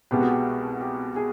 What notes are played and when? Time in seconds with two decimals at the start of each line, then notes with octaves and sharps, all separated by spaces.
0.11 C2 B2 G#3 B3 G4
0.21 F#4
0.31 G4
0.81 G4
1.16 G#4